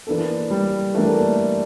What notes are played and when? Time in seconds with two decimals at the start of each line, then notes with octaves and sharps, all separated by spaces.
0.07 E3 A#3 D4 A4
0.50 G3
0.94 E3 A3 A#3 D4 A4